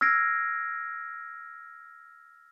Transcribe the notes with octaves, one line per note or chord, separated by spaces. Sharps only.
E6 F6 G#6 A#6 C7 D7